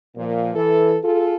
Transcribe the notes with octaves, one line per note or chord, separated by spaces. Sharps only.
A#2 F3
E3 A4
F4 G#4 A4